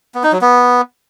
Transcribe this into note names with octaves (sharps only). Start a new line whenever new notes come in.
B3
D#4
F#3
B3